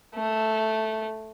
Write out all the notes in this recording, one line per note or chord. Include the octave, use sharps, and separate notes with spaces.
A3